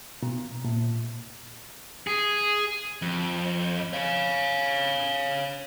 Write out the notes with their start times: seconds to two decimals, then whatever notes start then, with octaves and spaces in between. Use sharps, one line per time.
0.23 B2
0.65 A#2
2.07 G#4
3.02 F2
3.93 C#5 F5